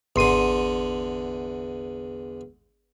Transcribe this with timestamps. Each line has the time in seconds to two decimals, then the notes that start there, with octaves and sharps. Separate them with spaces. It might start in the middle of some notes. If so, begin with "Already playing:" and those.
0.16 G#1 E2 D3 C6 D#7